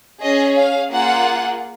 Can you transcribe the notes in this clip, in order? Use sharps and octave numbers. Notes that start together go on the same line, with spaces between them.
C#4 G#4 D#5
F5
A#3 F4 G#4 F#5